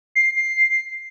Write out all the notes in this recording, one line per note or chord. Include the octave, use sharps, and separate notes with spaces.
C7